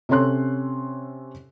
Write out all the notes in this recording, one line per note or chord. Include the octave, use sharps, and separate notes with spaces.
C3 C#4 A4 C#5 C6 F#6